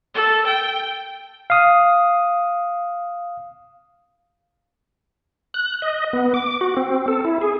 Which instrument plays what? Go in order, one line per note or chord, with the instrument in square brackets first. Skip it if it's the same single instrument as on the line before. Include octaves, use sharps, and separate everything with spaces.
[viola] A4
G5
[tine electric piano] F5 D#6
[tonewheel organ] F#6
D#5
B3
D6
F#4
C4
A4
E4
G#4